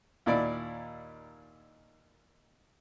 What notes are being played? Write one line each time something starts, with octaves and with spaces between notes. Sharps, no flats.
D#2 A#2 E4 D5